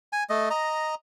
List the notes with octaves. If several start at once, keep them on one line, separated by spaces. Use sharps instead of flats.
G#5
A3 D#5
D#5 A#5